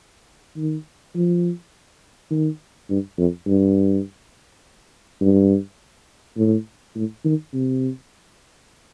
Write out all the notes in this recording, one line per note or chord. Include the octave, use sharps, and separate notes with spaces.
D#3
F3
D#3
G2
F2
G2
G2
A2
A2
D#3
C3